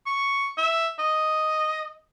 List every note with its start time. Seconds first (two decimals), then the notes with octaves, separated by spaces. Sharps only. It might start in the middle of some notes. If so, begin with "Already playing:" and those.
0.06 C#6
0.58 E5
0.99 D#5